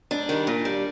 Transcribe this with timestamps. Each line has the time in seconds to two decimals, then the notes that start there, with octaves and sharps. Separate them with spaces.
0.11 G#2 D4
0.29 D#3 G3
0.47 A#2
0.65 G3